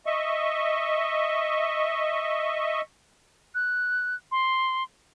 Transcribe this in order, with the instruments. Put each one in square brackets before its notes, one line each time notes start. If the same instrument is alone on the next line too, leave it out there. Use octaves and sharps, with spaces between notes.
[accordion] D#5 E5 C#6
[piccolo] F#6
C6